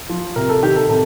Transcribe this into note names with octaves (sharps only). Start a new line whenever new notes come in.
F3
C3 A#4
A4
D#3 G4
A4
C3 A4